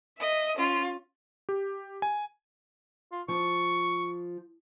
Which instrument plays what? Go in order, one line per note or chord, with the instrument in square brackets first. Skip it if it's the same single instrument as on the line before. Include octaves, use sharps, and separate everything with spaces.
[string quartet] D#5 E5
C#4 F4
[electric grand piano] G4
G#5
[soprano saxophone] F4
[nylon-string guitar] F3 [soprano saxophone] C#6